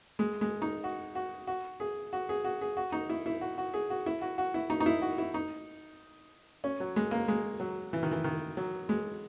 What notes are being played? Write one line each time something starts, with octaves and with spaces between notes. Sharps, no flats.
G#3
G#3
D#4
F#4
F#4
F#4
G#4
F#4
G#4
F#4
G#4
F#4
D#4
E4
E4
F#4
F#4
G#4
F#4
E4
F#4
F#4
E4
D#4
D#4
E4
F#4
E4
D#4
C#4
F#3
G#3
A#3
G#3
F#3
E3
D#3
E3
D#3
F#3
G#3